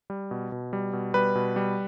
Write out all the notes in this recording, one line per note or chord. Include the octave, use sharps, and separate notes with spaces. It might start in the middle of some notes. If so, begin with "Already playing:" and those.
G3
B2
B2
G3
B2
G3 B4
B2
G3